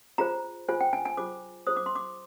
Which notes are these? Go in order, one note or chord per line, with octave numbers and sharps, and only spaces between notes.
F4 G#4 C5 A#5
F4 G#4 C5 G#5
G5
G#5
G#5
F4 G#4 C5 D6
F4 G#4 C5 D#6
D6
C6
D6